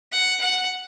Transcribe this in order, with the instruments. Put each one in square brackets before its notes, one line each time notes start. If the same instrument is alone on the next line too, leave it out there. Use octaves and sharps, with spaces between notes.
[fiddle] F#5
F#5